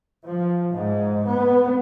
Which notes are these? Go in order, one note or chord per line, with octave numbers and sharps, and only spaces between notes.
F3
G#2
B3